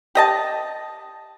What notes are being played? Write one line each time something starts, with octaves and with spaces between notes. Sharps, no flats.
G4 D#5 A5